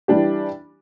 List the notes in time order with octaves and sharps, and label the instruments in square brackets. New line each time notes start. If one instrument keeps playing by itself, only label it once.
[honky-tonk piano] E3 G3 D4 G4